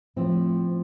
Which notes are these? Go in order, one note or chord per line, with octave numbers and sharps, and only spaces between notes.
A2 F3 C4